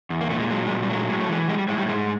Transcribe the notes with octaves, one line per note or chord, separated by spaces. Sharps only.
E2
A#3
A#2 A3
G#3
F#3 G#3
G#3
A#2 G3
G3
F#3 A3
G#3
A2 G#3
A3
E3 G#3
G3 G#3
G3
A2 G#3
G3
G#2 G#3